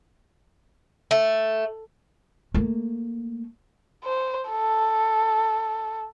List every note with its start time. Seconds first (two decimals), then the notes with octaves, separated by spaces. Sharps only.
1.11 A3
2.54 A3 A#3
4.04 C5
4.50 A4